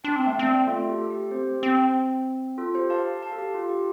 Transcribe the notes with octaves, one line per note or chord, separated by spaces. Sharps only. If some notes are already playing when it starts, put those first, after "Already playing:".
D4 G5 C6
C4
A3 F5 A5
C4
D5 G5
A3 F4 A4
G4
A4
G4
C4 G4 C5
C4
F4 A4
G4 C5
F5 A5
F5 A5
A4
G4
F4
G4